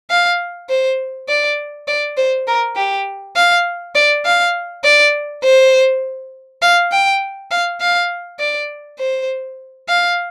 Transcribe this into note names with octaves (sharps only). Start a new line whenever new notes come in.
F5
C5
D5
D5
C5
A#4
G4
F5
D5
F5
D5
C5
F5
G5
F5
F5
D5
C5
F5